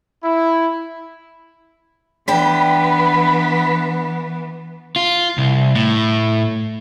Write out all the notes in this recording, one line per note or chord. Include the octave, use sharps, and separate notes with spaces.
E4
E3 B3 D4 D5 G5 B5
F4
C2
A2